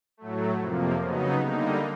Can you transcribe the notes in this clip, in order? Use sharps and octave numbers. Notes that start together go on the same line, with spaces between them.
A2 F#3 A3
F2 C3 F3 A#3
C#3 F#3 B3 D#4
D3 G3 A#3 D#4